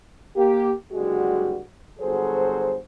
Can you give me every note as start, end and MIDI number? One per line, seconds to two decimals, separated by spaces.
0.36 0.71 58
0.36 0.71 67
0.92 1.60 30
0.92 1.60 43
0.92 1.60 50
0.92 1.60 55
0.92 1.60 56
0.92 1.60 66
1.99 2.75 31
1.99 2.75 54
1.99 2.75 66
1.99 2.75 68
1.99 2.75 69
1.99 2.75 72